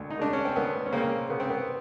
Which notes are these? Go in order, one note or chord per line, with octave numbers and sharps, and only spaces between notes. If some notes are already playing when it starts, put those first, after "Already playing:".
Already playing: D2
D#4
C#3 D4
C#4
C4
D2 B3
C#4
C#3 A#3 C4
C#3 B3
C4
B3